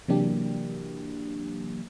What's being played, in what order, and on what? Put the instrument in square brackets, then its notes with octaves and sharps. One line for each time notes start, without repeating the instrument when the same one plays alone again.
[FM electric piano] C3 E3 F#3 A#3 D4 G4